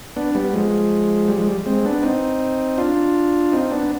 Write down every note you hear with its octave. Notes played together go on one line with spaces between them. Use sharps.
B3 D4
G3 B3
F3 G#3
G3
F3 G#3
G3
G#3 C4
B3 D4
C4 D#4
D4 F4
C4 D#4
B3 D4